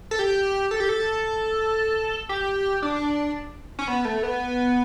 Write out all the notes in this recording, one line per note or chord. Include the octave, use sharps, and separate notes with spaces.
A4
G4
A4
G4
A4
G4
D4
C#4
B3
A3
B3